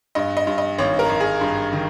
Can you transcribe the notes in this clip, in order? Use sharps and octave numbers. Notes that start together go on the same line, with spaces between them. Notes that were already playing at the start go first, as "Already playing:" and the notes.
G2 D#5
D#5
G2
D#5
G#1 C#5
A#4
G#1
G#4
G2
D#3